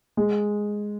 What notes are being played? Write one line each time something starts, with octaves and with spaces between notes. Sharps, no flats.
G#3